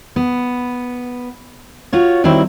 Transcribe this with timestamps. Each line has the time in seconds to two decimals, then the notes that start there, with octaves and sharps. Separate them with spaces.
0.16 B3
1.93 F4 F#4 C#5
2.24 D#3 F#3 G3 C4 E4